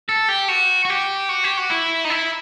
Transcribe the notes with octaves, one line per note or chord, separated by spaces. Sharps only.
A4
G4
F#4
F#4
G4
F#4
G4
F#4
E4
D#4
E4